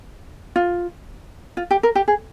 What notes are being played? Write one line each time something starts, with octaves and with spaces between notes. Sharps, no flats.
F4
F4
G4
A#4
G4
G#4